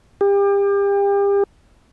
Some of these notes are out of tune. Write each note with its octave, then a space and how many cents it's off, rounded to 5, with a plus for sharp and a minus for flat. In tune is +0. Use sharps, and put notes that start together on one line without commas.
G4 +35